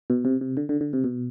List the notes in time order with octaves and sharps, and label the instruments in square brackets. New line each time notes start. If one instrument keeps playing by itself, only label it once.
[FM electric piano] B2
C3
C3
D3
D3
D3
C3
B2